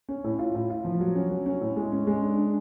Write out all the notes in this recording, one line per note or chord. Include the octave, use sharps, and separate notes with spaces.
C#4
A2
F4
A2
F4
F3
F#3
C#4
F#3
C#4
A2
G#3
C#4
G#3
D4
D4